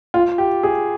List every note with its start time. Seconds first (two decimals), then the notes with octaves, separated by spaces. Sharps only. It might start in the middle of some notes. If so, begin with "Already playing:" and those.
0.14 F4
0.38 G4
0.63 G#4